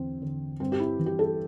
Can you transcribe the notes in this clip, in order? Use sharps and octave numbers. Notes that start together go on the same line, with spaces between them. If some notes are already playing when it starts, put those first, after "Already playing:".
Already playing: E2 D3 C4
D3
G2 C4
G4
E4
E3
G4
A4